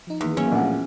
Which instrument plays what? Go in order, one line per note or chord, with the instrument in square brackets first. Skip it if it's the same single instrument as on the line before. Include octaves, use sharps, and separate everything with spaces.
[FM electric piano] F3 D#4
[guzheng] E2 [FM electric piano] D#3 [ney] A#3
[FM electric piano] F#3 [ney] A#3 [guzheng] C#4 C#5 E5
[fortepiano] A#1 A2 F#5